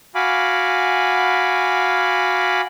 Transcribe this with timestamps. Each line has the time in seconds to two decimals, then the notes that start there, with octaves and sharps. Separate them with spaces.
0.15 F#4 F5 G#5 B5 D6